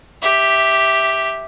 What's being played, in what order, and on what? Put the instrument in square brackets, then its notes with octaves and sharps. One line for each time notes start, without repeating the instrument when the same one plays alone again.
[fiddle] G4 E5